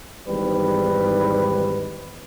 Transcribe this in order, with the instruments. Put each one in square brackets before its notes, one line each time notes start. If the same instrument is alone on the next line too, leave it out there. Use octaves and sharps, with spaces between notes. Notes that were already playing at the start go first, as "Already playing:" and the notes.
[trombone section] G#1 E2 G#2 G3 B4